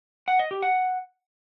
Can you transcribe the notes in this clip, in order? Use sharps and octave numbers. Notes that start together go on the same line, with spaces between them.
F#5
D#5
G4
F#5